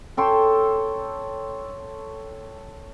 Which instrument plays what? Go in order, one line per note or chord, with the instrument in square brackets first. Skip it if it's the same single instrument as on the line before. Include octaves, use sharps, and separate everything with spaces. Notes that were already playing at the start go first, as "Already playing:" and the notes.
[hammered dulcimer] A4 C#5 G5 C6